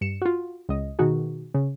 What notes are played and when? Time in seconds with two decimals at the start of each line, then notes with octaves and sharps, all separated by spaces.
0.01 G2 C#7 E7
0.22 F4 F#4
0.69 C#2 D#5
0.99 B2 D#3 D#4 F#4 G#4
1.54 C#3